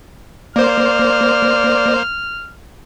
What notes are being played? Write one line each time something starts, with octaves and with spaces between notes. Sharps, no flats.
A#3 C5 D5 F6